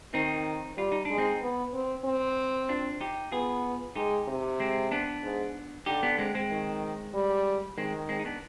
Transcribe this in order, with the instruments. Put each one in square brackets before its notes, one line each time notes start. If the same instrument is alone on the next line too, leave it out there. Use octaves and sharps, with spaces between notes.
[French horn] D#3 [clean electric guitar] C4 D#4
[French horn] G3 [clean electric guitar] F4
[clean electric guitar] D#4
[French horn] G#3 [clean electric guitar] D4
[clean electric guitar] C4 D#4
[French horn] B3
C4
C4
[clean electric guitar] D4 F4
D#4 G4
[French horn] B3 [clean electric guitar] F4 G#4
[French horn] G#3 [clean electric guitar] D#4 G4
[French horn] C3
[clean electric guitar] G#3 C4
B3 D4
[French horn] G#2
[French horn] D3 [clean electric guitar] D#4 G4
[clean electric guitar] B3 D4
G#3 C4
G#3 C4
[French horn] D#3
G3
[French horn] D#3 [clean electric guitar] G#3 C4
[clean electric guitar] G#3 C4
D#4
B3 D4